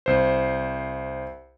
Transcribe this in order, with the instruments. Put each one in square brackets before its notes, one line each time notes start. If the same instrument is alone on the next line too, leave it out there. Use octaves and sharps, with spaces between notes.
[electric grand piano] C2 C5